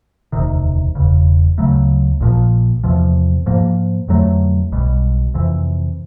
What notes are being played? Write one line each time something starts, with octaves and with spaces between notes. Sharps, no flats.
E1 D2 C3 D#3
E1 E2 C#3
D2 C#3 F#3 A3
A#1 A#2 F3
E2 C3 F3
G#2 F3 A#3
F2 D3 F#3 A3
B1 B2 G3
F2 C3 E3